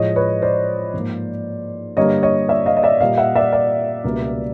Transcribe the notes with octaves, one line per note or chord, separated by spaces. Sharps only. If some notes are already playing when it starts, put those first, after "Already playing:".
Already playing: A2 F3 G#3 C#5 D#5
B4 C#5
C5 D5
G#2 F3 A#3
G2 D3 G3 A#3 C#5 D#5
C#5 D#5
D5 E5
D#5 F5
D#5
D5 E5
A#2 G3 A#3 D#5 F5
E5 F#5
D5 E5
D5 E5
C#2 B2 G3 A#3